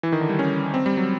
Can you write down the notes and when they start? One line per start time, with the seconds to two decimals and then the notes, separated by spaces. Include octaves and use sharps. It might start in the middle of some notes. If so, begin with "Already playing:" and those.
0.03 E3
0.12 D#3
0.21 D3
0.29 G3
0.39 C#4
0.74 C4
0.86 G3
0.97 F#3